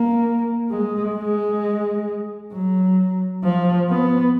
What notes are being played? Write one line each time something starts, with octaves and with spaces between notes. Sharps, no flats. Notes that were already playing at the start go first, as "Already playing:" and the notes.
Already playing: A#3
G#3
G#3
F#3
F3
B3